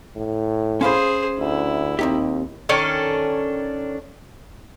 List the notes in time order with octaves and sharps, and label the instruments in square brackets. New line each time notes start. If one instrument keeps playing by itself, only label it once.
[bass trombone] A2
[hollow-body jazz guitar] C#4 F5 B5 [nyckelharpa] G#4 C5
[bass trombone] D2 [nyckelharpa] E4
[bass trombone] D#2 [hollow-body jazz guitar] C4 D#4 G4
[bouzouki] D#3 C#4 D4 A4